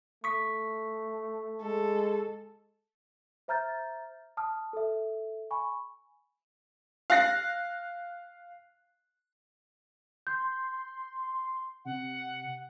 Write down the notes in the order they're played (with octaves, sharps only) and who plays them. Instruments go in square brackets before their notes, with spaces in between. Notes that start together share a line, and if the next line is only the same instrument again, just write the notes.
[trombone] A3 [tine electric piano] C#6 D#6 B6
[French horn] G#3 [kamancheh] A4
[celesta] C5 E5 A#5 F6 G6 A6
A5 D#6 F6
A4 E5
G#5 B5 C#6
[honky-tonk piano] F5 F#6 A#6 C7
[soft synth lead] C6 [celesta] G6
[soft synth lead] C3 [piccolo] F#5